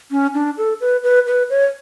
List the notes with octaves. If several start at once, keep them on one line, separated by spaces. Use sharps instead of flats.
C#4
D4
A4
B4
B4
B4
C#5